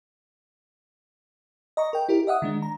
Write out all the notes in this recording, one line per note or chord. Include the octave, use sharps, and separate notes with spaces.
D#5 A#5 C#6
A#4 G5
E4 G4 A#4
D#5 E5 F#5 D#6
D#3 G#3 D4
A#5